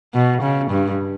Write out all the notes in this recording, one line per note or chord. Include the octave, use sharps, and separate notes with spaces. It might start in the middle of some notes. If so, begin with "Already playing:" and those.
B2
C#3
G2